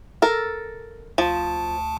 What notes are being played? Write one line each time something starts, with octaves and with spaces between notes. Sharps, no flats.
A4 A#4
D2 F3 A5